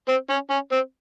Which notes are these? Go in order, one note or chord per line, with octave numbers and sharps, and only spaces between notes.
C4
C#4
C#4
C4